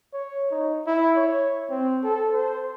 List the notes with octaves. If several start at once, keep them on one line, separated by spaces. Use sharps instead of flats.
C#5
D#4
E4
C#5
C4
A4
C5